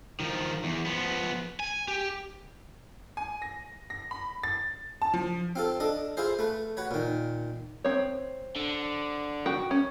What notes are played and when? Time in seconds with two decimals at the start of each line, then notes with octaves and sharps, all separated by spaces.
0.20 D#3 F3
0.64 E2
0.86 F3 B3
1.60 G#5
1.88 G4
3.17 G#5
3.42 A#6
3.90 A#6
4.11 B5
4.43 A6
5.02 A5
5.14 F3
5.56 C4 F4 A4
5.80 D4 A4 D#5
6.17 E4 F4 G#4 C5
6.39 A3 B4
6.77 F#4 B4 C#5
6.91 A#2 D#3
7.84 C4 C#5
8.56 D3
9.46 F#4 G5
9.71 C#4